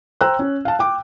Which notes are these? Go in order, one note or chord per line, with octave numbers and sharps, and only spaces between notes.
C5 G5 A#5 E6 F#6
C#4
F5 A5
G5 D6